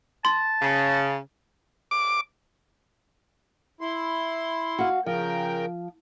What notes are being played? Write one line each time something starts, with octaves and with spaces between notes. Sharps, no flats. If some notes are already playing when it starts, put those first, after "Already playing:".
A5 C6
C#3
D6
E4 C6
F#4 F5
C#3 F3 A#4 G5